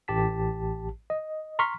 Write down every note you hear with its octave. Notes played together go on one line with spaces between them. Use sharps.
A1 G4 A5 B6
D#5
A#5 C6 C#6 F6 B6